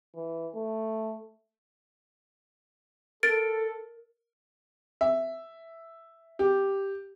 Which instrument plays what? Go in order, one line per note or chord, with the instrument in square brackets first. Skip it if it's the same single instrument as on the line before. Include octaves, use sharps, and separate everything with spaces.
[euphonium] E3
A3
[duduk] A4 [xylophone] A#4 A6 D7
[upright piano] E5
G4